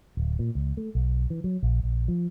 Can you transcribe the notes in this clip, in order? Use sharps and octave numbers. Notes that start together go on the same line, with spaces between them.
D1
A#2
C#2
A3
B1
E3
F#3
A#1
A#1
F3